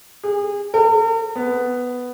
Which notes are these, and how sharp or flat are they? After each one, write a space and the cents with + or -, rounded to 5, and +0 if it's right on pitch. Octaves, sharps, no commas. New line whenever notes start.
G#4 -35
A#4 -45
B3 +5